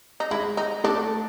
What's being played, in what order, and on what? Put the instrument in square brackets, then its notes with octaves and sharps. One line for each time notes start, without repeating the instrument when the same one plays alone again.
[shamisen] D#4
[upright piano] G#3 [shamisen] E4
[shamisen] D#4
[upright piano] A3 [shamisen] D4